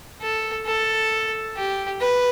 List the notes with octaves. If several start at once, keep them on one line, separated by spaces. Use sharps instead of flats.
A4
A4
G4
B4